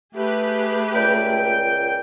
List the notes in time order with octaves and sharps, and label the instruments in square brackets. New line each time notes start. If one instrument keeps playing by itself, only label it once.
[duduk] A3 [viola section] G4 G#4 B4
[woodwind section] C#2 A#2 G5